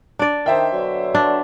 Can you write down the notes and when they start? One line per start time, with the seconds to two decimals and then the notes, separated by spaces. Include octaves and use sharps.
0.19 D4 D5
0.46 D#3 C5 E5 G5
0.72 B2 D3 F#3
1.15 D4